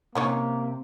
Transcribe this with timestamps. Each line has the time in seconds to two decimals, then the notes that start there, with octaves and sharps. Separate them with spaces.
0.15 C3 A#3 C#4 D#4 C#5